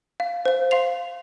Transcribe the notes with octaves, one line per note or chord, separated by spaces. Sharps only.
F5
C5 F5
F5 C6 C7 F7